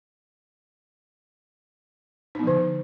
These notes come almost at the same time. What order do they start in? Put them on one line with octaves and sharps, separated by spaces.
D#4 B3 F3 D3